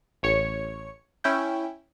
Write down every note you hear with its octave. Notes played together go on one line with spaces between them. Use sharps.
A1 C#5 C#7
C#4 E4 G5